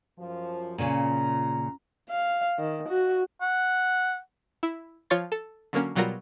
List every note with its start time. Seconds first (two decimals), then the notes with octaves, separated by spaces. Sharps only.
0.19 F#2 F3
0.78 A#2 C#3 F4 A#5
2.10 F5
2.59 D#3
2.89 F#4
3.41 F#5
4.63 E4
5.10 F3 F4 C#5 C6 A6
5.32 A4
5.73 D3 F#3 A#3 C#4
5.96 B2 F#3 G3 F4 F#4 A#4